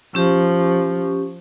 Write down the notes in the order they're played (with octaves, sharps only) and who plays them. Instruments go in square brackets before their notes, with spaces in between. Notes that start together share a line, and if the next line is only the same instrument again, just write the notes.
[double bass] F3 [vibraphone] C#4 G4 C#6